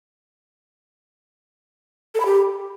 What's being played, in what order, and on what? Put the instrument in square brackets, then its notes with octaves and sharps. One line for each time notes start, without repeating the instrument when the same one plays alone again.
[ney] A4
B5
G4